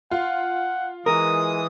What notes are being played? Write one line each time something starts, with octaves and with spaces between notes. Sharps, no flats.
F4 F#5
E3 G#3 A#4 D#6